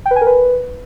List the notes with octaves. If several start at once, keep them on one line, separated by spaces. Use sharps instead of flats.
G5
B4
G#5
A#4
B4